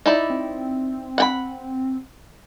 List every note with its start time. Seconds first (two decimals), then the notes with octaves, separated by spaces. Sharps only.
0.06 D#4 E4 D5
0.30 C4
1.18 F#5 G5 B5